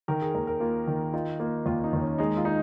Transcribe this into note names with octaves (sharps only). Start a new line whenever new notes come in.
D#3 A#4
G#4
D#2 A#4
A#4
A#3 F4
D#3
D#4 F4
A#3 F4
D#2 F4
D#4
D#2
C#4
G#3 D#4
F4
D#4